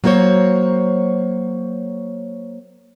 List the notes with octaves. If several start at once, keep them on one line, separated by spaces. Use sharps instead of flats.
F#3 A#3 F#4 C5 C#5